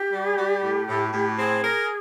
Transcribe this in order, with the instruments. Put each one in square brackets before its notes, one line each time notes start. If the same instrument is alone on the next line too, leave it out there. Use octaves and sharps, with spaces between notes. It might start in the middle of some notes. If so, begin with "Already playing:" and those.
Already playing: [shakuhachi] G4
[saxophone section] G3
G3
A2
A2
A2
[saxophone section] C4 [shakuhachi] G#4
[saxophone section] A#4